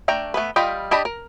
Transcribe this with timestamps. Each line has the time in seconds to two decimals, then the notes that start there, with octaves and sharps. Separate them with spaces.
0.08 A3 D4 G5 A#5
0.34 A3 B3 B4
0.56 G3 F4 D#5 G5 B5
0.91 D4 G4 D#5 A5 B5
1.05 A#4